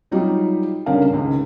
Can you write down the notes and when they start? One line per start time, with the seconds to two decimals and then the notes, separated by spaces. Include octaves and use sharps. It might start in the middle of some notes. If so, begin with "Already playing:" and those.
0.11 F#3 G3 D#4 F4 G4
0.86 C#2 D3 G3 C#4 A#4 F5
1.09 G#1 C#2